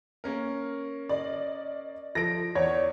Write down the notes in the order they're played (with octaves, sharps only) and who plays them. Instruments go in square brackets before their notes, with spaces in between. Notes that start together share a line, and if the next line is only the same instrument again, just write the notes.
[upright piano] A#3 C#4 A#4
[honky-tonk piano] D5 D#5
[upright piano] F3 A4 D7 [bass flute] F4 [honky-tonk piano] A#6
[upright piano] E2 [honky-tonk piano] C#5 [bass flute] D5